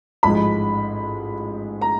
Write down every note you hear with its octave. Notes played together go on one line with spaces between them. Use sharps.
A1 G#2 F3 G#3 B5
A#5